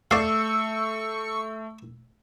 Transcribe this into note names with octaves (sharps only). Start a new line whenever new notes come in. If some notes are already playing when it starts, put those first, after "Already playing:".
A3 D5 F5 C#6 E6